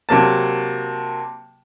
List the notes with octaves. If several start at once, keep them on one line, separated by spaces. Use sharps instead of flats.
C3 F#3 A#3 A5